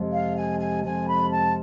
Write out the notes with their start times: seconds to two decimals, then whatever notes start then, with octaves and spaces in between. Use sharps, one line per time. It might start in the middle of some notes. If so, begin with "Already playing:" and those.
Already playing: F2 C3 F3 G#3
0.12 F5
0.36 G#5
0.59 G#5
0.83 F2 C3 F3 G#3 G#5
1.07 B5
1.30 A5